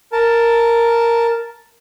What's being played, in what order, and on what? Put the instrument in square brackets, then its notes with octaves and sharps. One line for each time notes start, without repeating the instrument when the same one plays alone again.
[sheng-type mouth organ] A#4 A5